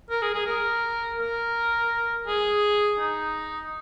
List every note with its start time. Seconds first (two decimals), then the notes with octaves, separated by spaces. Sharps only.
0.10 A#4
0.22 G#4
0.34 G#4
0.46 A#4
1.19 A#4
2.27 G#4
3.00 D#4